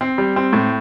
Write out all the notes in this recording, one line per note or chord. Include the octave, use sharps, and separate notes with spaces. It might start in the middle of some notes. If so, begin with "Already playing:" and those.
C4
G3
C4
A2